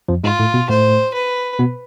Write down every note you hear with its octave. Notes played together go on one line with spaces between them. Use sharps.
F2 F3
G#2 G#3 F4
A2 A3
B2 B3
A2 A3 C5
B4
B2 B3